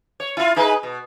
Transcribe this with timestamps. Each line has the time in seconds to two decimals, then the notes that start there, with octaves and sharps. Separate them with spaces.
0.20 C#5
0.37 E4 F4
0.56 D#4 G#4 B4
0.83 B2